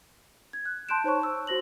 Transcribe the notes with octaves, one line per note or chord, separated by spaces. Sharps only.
G#6
F#6
A5 C6 F#6 G6 D7 E7
D#4 C5 C#5 A5 C#6
E6
F#4 C5 A#6 F#7